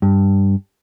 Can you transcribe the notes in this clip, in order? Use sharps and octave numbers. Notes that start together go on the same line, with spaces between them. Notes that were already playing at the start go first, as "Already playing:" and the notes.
G2